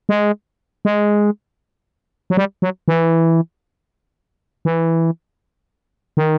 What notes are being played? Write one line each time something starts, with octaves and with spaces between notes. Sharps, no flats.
G#3
G#3
F#3
G3
F#3
E3
E3
D#3